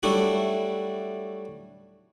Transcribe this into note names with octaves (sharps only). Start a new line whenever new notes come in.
F#3 G3 A3 D4 E4 F#4